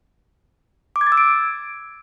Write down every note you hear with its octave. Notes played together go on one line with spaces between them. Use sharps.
D6
G#6
A6
E6
D7